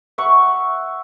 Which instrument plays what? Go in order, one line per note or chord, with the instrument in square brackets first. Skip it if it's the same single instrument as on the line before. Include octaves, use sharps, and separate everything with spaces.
[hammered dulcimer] E5 F#5 C#6